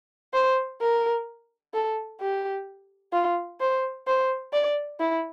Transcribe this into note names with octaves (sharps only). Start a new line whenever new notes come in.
C5
A#4
A4
G4
F4
C5
C5
D5
E4